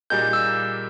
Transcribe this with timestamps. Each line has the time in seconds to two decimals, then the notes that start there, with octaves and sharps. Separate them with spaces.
0.10 A#2 G3 A#3 D#4 G#4 G6
0.33 E6